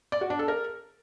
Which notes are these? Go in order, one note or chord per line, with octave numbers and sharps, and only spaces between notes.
D5
F#4
D4
A4
A#4